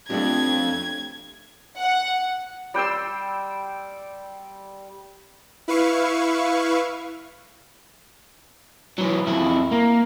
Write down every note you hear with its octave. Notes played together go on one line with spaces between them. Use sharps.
F2 A3 D4 G4 G#6
F#5
G3 G5 C6 E6
E4 B4 F5 C#6
E3 F#3
F2 E4
A#3